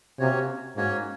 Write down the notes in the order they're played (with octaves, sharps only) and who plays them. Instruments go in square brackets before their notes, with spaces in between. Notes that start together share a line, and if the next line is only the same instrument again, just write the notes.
[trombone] C3 [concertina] A#3 C#4 F#4 C#5
[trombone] G#2 [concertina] A#3 C#4 F#4 C#5